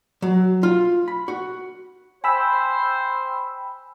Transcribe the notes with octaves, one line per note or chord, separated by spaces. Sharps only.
F#3
F4
B5
F#4
C5 G5 G#5 B5 E6